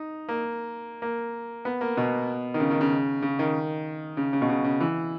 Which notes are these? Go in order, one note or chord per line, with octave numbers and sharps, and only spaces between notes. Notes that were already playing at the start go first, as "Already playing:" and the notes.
Already playing: D#4
A#3
A#3
B3
A#3
B2
D#3
C#3
D#3
C#3
C#3
D#3
C#3
C#3
B2
C#3
C#3
E3